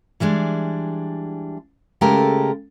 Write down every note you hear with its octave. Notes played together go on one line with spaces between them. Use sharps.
E3 G3 G#3 D4
C#3 G#3 A3 G4 A4 A#4